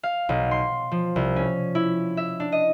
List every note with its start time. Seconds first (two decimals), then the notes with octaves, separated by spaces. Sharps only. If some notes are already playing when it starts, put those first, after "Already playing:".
0.03 F5
0.29 B1
0.51 C6
0.91 F3
1.16 C2
1.36 C#4
1.75 E4
2.17 E5
2.40 D4
2.52 D#5